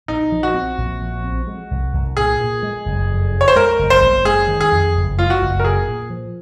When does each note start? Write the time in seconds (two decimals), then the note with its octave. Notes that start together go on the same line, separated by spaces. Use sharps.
0.08 A#1 D#4
0.32 F3
0.43 F#4
0.54 C4
0.78 A#1
1.02 F3
1.24 C4
1.47 G#3
1.71 C2
1.93 C2
2.17 A#2 G#4
2.41 A#2
2.63 G#3
2.86 F#1
3.10 F2
3.32 C#3
3.41 C#5
3.48 C5
3.56 G#3 A#4
3.79 F#1
3.90 C5
4.02 F#1
4.25 G#3 G#4
4.48 D#3
4.61 G#4
4.71 F2
4.95 F#1
5.18 G#3 F4
5.30 F#4
5.41 F#1
5.60 A#4
5.64 A#2 G#4
5.88 A#2
6.10 F3